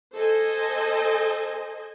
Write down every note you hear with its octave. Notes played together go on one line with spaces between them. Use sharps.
A4 C5 D#5 G#5